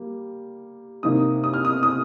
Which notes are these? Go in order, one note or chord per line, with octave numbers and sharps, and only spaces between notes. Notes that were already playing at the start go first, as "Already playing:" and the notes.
Already playing: G3 A#3
C3 D#3 A#3 D#4 D#6
D#6
F6
D#6
D#6